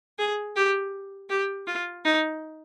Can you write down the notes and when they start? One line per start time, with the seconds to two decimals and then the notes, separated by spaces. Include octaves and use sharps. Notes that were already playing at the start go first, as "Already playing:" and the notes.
0.19 G#4
0.56 G4
1.30 G4
1.67 F4
2.05 D#4